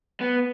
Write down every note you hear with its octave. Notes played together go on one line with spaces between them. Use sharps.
B3